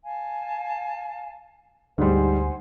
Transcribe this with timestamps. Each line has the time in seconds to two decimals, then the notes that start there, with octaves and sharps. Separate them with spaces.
0.04 F5 G#5 A5
1.98 D2 G#2 G3 C5 F#5 G#5